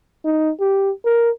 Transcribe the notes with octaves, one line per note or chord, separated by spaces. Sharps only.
D#4
G4
A#4